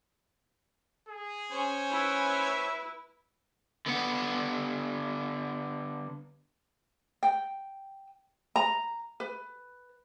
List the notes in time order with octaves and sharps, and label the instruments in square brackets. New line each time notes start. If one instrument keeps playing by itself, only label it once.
[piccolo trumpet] G#4
[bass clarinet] C#4 [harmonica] C5 C#5 G#5
[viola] E4 B4 [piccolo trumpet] E5
[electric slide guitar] D3 B3 F#5
[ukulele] G5
A#5
B4